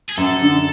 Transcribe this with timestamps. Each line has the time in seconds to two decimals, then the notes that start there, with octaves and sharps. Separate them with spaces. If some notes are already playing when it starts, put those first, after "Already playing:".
0.09 G#4
0.17 F#2 A4
0.42 D3